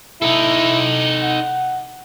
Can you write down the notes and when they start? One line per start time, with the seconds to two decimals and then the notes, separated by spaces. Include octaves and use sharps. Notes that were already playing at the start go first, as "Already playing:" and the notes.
0.22 D#4 E4 A4
1.23 F#5